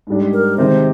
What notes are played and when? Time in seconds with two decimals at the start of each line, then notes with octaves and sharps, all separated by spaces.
0.07 G#2 G3 D4
0.33 A#4
0.57 C3 D#3 G#3 C5